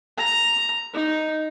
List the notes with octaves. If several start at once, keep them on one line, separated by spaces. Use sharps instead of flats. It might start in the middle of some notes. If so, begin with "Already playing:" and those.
A#5
D#4